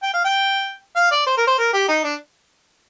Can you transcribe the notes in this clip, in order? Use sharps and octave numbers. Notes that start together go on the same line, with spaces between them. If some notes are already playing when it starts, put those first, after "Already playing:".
G5
F5
G5
F5
D5
C5
A#4
C5
A#4
G4
D#4
D4